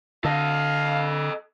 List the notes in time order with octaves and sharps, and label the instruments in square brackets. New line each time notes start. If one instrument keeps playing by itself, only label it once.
[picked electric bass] D3 [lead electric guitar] A4 D#5 [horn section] F5